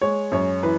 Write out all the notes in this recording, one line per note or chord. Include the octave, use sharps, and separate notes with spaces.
G#3 C#5
F#2 C#5
E3 B4